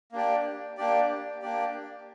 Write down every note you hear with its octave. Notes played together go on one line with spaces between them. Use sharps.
A#3 D4 G4 D5
A#3 D4 G4 D5
A#3 D4 G4 D5